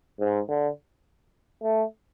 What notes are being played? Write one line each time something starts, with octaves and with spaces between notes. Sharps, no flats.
G#2
D3
A3